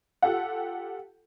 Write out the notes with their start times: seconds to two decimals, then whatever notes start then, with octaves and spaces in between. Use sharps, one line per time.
0.22 F4 G4 A4 F#5